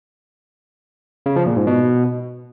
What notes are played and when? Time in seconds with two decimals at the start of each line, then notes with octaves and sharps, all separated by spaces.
1.26 C#3
1.36 F3
1.46 A#2
1.57 G#2
1.67 B2